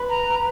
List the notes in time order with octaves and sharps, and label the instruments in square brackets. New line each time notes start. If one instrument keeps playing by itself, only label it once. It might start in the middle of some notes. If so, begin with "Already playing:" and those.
Already playing: [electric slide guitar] B4
[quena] A#5